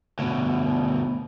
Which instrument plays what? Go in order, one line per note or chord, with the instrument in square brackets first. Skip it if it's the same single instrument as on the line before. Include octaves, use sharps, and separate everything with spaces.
[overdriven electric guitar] D2 B2